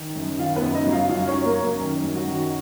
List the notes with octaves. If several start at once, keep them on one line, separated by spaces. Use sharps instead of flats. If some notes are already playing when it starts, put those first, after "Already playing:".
Already playing: D#3
F#2
D#3 F4 F5
B3 B4
F#2
D#4 D#5
F#3
F4 F5
F#2 F4 F5
C#4 C#5
F#3
A#3 A#4
F#2
A#3 A#4
D#3 C#4 C#5
F#2
F#3 F#4
D#3